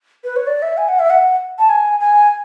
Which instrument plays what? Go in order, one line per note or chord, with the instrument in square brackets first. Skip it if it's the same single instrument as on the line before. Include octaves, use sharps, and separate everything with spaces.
[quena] B4
C#5
D5
E5
G#5
F#5
E5
F#5
A5
G#5
G#5